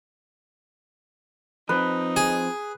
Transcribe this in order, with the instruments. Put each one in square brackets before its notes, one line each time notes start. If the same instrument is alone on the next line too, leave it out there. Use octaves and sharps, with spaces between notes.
[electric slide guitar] F3 C4 [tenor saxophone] D#4 [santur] B4
[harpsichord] G#4